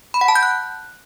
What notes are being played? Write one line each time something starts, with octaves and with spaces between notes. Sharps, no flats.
B5
F#5
A5
G6
F#6